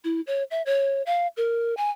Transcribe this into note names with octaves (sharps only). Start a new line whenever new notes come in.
E4
C#5
E5
C#5
F5
A#4
G#5